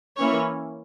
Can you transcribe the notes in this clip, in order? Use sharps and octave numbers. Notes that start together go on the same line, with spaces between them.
E3 A#3 C#4 C#5